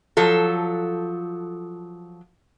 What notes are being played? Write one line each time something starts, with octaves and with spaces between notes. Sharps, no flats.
F3 F#3 A4